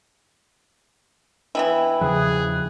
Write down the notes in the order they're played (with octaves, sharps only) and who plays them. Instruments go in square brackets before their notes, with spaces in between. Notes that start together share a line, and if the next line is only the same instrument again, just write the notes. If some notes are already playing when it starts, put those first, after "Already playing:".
[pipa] E3 B3 E4 [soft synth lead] G5
[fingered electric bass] E2 C#3 F3 [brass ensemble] G#4 [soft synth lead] F#6